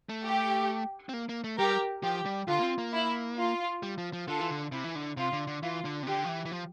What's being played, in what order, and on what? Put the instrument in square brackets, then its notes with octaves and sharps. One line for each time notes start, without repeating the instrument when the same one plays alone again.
[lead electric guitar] A3
[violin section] G4
[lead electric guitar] C4
A#3
A#3
A3
[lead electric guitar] G3 [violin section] G4 A#4
[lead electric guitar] F3 [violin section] G4
[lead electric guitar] G3
[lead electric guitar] D3 [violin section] F4
[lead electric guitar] A#3
C4
A#3
[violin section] E4
F4
[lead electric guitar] G3
F3
F3
[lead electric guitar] D3 [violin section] F4 A4
[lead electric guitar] E3
D3
[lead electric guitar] C3 [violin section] E4
[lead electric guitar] E3
D3
[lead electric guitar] C3 [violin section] F4
[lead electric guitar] D3
D3
[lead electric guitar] E3 [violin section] F4
[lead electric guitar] D3
C3
[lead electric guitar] D3 [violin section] G4
[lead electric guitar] F3
E3
E3
F3